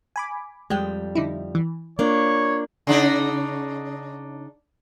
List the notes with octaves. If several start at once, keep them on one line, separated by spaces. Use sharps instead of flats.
G#5 B5 D6
F2 G3 G#3 G5
D3 D#4 E4
E3
A#3 D4 F4 C#5
C#3 D4 D#4